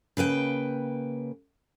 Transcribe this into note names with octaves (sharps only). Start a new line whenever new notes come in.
C#3 A#3 B4 G5